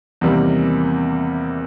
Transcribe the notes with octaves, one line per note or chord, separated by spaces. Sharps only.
E2 C3 D#3 G3 A#3